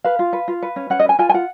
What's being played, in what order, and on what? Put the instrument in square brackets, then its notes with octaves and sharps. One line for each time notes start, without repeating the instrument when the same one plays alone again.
[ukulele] B4 F5
F4
B4
F4
B4
C#4
C#4 F#5
D#5
B4 G#5
F4 G#5
G#5
F4 F#5